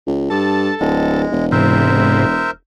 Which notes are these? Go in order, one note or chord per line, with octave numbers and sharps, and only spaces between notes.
C#2
G2 A4 A5
D1 G#3
E1
G#2 C3 E3 A#4 C5 E5